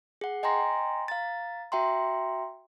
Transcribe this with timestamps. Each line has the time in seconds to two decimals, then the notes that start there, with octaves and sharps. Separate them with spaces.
0.21 G#4 F#5
0.43 D#5 G5 G#5 A#5 C6 A#6
1.08 F5 A#5 A6
1.72 F#4 E5 G5 A#5 C6